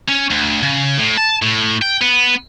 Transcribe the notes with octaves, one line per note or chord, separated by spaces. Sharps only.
C#4
D2
C#3
A2
A5
A2
G5
B3